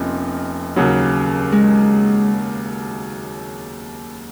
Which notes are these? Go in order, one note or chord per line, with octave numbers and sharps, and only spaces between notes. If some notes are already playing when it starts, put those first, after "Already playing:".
Already playing: F1 F2 F3 A#3 C#4 D#4
D#2 C#3 F#3
G#3